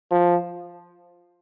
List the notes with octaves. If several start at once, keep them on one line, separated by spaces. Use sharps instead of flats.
F3